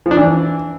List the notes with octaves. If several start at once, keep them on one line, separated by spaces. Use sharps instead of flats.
F3
D4
E3